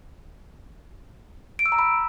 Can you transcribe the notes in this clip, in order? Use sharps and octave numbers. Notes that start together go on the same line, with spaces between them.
D7
E6
A#5
B5